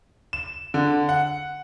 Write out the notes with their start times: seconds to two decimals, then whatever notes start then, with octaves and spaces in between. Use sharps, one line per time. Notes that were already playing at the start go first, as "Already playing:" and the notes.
0.33 E7
0.74 D3
1.09 F#5